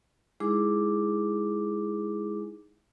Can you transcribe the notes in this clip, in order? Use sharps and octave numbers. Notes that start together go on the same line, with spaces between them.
G#3 D#4 E4 G#4 D6